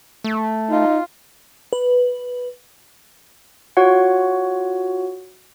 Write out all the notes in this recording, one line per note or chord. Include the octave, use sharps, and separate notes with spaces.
A3
D#4 F4
B4
F4 F#4 C#5 F#5